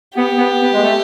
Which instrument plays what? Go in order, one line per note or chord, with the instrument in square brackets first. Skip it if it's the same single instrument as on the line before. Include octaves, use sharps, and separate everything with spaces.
[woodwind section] B3 [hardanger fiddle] G4
[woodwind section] B3
B3
G#3
A3